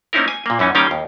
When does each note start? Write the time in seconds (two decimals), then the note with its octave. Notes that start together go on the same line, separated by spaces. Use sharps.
0.13 A#3 C4 C#4 D#4 E4 A#4
0.28 G#5
0.46 A#2 A#3
0.59 F#2 E3 C#4 D#4
0.75 D#3 G3 A#3 C#4 F5 G5
0.91 D#2